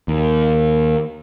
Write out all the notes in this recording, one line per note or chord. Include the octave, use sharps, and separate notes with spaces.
D#2